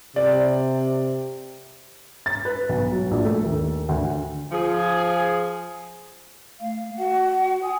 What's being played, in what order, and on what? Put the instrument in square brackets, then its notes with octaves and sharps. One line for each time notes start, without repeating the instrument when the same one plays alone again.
[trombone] C3 [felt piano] D5
[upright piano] A6
B4
B1
F#3
A#1
A3
D#2
D2
[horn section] F3 G#4
[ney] A3 [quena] F5
[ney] F#4 [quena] F#5
[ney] G#5 [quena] D#6